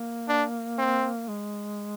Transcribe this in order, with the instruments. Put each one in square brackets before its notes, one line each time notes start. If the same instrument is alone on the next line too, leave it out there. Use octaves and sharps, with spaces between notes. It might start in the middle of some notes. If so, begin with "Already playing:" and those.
Already playing: [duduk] A#3
[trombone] D4
C4
[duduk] G#3